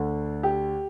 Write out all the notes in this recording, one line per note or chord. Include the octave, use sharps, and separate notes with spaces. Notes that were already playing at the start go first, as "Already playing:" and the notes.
Already playing: D2 D3
G4